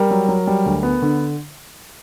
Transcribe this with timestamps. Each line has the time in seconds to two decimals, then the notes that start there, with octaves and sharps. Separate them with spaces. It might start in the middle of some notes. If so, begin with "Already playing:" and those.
Already playing: G3 A#4
0.11 F#3
0.28 F#3
0.47 G3
0.66 D2
0.83 B3
1.02 D3